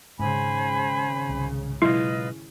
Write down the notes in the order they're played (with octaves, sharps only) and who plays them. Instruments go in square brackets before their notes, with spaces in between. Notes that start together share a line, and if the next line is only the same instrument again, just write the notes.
[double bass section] G#1 C#3 [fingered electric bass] G#2 [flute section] C5 G#5 B5
[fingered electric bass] C2
[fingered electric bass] B2 F#3 G#3 [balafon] E4 [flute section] F4 B4 D#5